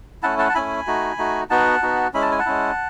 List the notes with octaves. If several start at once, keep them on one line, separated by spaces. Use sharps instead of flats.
A3 C#4 E4 F#5 A5
F#5 A5
A5
A3 C#4 E4 G#5 B5
A3 D#4 F#4
A3 D#4 F#4
B3 D#4 F#4 F#5 A5
B3 D#4 F#4
G#3 C#4 E4 B5
A5
G#5
F#5 A5
G#3 C#4 E4